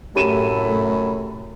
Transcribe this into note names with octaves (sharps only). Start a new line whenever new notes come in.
F#2 A2 C3 A3 G4 B5 D#7 E7